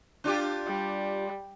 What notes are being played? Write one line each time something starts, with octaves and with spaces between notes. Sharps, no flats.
D4 F4 G4
G3